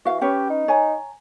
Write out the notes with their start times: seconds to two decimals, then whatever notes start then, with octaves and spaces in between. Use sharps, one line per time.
0.05 E3 F#4 F5
0.21 C#4 G4 B4 C#5
0.50 D#4
0.68 C#5 G#5 A#5